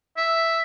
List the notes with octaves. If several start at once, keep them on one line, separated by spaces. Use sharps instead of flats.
E5